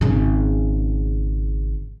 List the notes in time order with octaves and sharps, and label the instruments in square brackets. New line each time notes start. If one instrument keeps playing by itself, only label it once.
[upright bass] G#1 C#3